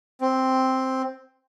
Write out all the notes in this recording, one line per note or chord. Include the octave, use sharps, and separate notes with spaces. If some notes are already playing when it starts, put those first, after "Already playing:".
C4